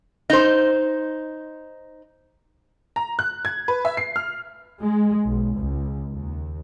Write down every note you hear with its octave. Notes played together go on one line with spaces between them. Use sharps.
D#4 C5
A#5
F#6
G#6
B4
E5
C7
F6
G#3
B1
C#2
D#2